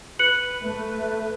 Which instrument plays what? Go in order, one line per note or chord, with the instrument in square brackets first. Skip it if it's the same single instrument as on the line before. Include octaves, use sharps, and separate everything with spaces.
[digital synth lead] B4 [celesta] F#6 C#7 F#7
[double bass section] A3